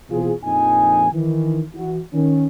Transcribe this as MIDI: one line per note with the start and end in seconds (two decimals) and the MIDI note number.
0.10 0.32 47
0.10 0.32 52
0.10 0.32 60
0.10 0.32 65
0.10 0.32 68
0.43 1.09 34
0.43 1.09 41
0.43 1.09 63
0.43 1.09 80
1.12 1.62 51
1.12 1.62 52
1.75 2.00 52
1.75 2.00 66
2.13 2.47 51
2.13 2.47 61